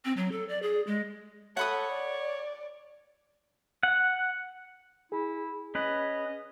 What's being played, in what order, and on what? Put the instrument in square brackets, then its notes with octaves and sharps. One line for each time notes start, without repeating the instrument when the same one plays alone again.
[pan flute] C4
F#3
A4
D5
G#4
G#3
[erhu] A4 [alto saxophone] C#5 [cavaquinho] F#5 B5 D#6
[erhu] D5
[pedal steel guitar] F#5
[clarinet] E4 [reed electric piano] G#4
[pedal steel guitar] C#4 B4 [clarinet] D#5